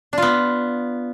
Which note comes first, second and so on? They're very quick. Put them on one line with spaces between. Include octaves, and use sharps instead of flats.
D4 F4 B3